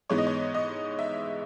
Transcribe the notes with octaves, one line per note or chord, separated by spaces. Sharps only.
G#2 E3 G#3 B3 C#5
D#5
C#5
D#5
E5